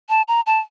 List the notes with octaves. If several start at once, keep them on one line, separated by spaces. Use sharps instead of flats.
A5
A#5
A5